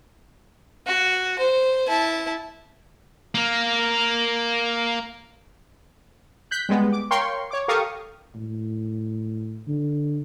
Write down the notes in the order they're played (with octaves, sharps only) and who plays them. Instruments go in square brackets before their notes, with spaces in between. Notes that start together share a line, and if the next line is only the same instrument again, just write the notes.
[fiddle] F#4
C5
E4 A5
[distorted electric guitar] A#3 A#4
[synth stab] F#6 G6 B6
G3 G#3 B3
D6
A#4 C#5 F5 G5 C6 C#6
C#5 D6
G4 A4 A#4 F5 C#6 D#6
[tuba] A2
D3